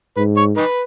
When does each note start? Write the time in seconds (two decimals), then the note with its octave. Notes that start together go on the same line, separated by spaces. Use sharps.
0.16 G#2 B4
0.37 C#5
0.57 D#4 B4